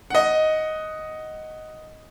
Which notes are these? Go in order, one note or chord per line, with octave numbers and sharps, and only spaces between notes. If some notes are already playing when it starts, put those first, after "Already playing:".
D#5 F#5